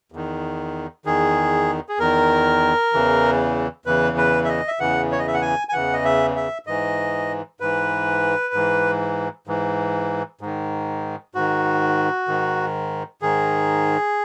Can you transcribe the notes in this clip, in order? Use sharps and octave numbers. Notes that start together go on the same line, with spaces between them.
E2 D#3
E2 D#3 G#4
G#4
E2 D#3 A#4
E2 C#3 E3
E2 C#3 E3 B4
B4
E5
D#5
E5
E2 C#3 E3 F#5
C#5
D#5
E5
F#5
G#5
G#5
E2 C#3 E3 F#5
D#5
E5
E5
G#2 E3 D#5
G#2 E3 B4
G#2 E3
G#2 E3
G#2 D#3
G#2 D#3 F#4
G#2 D#3
G#2 D#3 G#4